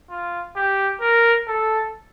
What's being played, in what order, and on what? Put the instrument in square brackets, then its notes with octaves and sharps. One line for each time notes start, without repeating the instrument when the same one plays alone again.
[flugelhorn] F4
G4
A#4
A4